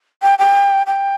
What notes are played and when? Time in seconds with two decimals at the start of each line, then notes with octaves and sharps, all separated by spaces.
0.22 G5
0.39 G5
0.87 G5